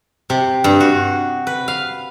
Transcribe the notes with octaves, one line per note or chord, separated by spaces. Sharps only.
C3
G2
F#4
B4
F5